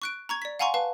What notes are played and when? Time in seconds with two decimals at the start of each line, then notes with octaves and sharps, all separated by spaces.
0.02 C#6 F#6 D7
0.29 A#5 C#6 G#6
0.42 D5 B6
0.59 F5 F#5 G#5 A#5 C6 C#6
0.74 B4 F5 A5